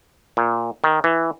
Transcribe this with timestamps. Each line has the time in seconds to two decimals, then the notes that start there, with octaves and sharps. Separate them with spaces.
0.37 A#2
0.84 D#3
1.04 E3